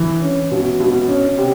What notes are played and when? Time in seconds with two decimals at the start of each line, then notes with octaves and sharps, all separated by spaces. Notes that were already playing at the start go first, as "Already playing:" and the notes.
Already playing: E3
0.22 C#4
0.51 B2
0.80 B2
1.09 C#4
1.38 C3